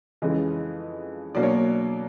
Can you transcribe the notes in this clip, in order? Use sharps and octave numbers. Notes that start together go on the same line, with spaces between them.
F2 C#3 E3 G#3 D#5
B2 F#3 A#3 D4 D5
C#5